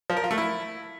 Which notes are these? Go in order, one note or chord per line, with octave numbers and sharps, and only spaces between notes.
F3
A#4
F4
A3
E4